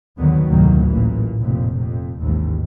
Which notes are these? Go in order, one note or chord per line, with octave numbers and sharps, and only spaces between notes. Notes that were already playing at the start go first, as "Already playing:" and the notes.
D#2 D3 D#3 F#3 B3
F1 D2 A2 D#3 F#3 A#3
A1 A#2 E3 A#3
F1 F2 A#2
F2
A1 D#2 G#2